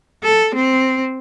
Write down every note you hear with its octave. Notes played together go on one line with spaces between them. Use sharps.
A4
C4